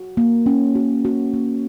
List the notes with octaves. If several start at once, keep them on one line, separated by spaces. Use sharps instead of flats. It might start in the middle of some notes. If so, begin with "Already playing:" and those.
Already playing: F#4
A#3
C#4
F#4
F#4
A#3